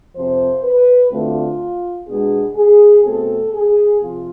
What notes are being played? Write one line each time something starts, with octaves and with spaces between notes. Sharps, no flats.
F2 C3 F3 C5
B4
D2 D3 A3 C4 F4
B2 G#3 B3 D4 G#4
G#4
B2 A3 C4 A4
G#4
C3 F3 F4